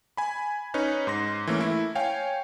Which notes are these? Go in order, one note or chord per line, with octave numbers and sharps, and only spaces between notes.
G#5 B5
C#4 D#4 B4 C#5
G#2 C6 A#6
E3 A3 A#3 C#4
A3 E4
C#5 F5 G5 G#5